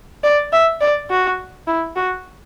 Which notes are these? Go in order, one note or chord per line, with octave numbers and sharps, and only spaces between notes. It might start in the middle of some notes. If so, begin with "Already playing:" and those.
D5
E5
D5
F#4
E4
F#4